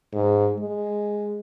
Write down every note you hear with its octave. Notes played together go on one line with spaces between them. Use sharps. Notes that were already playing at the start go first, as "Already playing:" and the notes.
G#2
G#3